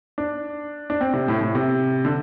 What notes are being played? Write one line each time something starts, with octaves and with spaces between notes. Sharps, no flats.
D4
D4
C4
C3
A2
A2
C3
D3